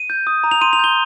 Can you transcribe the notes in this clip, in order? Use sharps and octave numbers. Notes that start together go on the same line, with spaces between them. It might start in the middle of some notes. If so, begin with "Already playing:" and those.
Already playing: D#7
G6
D#6
A#5
F7
C6 D#7
F7
G6 G7